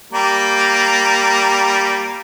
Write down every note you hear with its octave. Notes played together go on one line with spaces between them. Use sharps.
G3 A#3